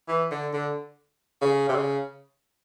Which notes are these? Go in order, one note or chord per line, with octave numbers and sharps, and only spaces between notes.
E3
D3
D3
C#3
C3
C#3